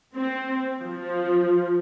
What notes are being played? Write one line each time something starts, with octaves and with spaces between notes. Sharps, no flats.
C4
F3